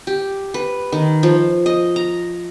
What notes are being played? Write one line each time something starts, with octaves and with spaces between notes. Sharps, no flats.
G4
B4
D#3
F3
D#5
A#5